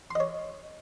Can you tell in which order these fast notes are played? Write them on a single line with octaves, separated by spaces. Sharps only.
C6 D#5 C#5